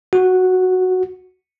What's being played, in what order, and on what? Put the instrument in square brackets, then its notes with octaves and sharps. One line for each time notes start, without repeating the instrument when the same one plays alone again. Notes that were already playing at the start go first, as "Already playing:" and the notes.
[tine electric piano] F#4